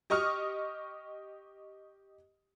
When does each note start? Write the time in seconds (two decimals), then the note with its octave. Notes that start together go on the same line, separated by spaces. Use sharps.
0.10 G4 D#5 C#6 D#6 F6